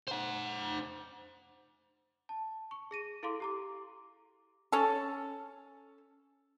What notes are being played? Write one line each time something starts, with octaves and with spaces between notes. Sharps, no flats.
C5 F#5
A5
C#6
G#4 A#6 D#7
E4 A4 F5 C6 D6
G4 A#5 D6
C#4 A4